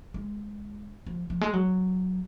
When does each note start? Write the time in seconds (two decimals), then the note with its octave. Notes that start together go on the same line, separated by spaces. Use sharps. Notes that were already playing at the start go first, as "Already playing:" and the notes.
0.14 G#3
1.07 F3
1.30 F3
1.41 G#3
1.53 F#3